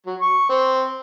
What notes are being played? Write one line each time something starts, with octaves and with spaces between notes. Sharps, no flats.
F#3
C#6
C4